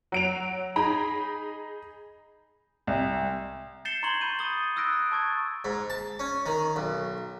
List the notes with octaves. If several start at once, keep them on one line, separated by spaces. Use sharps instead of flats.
F#3 D7 F7
D#4 G#4 A#5 B5
C2
G6 A6 C7 C#7 E7 G7
A#5 C6 C#6 G#6 F#7 G7
B5 G6 D#7
D#6 G6 A6 G7
D#6 E6 F#6 A#6 D7
A5 C#6 G#6 A6
G#2
A5
C#4
D#3
B1